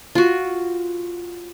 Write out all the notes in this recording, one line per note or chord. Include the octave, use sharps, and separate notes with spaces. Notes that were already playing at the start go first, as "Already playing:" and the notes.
F4 F#4